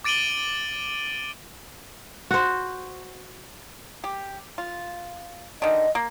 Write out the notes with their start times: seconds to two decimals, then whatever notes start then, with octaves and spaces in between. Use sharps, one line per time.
0.04 D6 A6 D7 D#7 F#7 G7
2.31 F#4 C5
4.04 G4
4.58 F4
5.62 D3 D#3 D#5
5.95 A#3